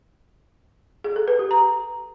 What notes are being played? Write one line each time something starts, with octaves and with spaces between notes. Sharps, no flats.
G#4
A4
B4
G4
A#5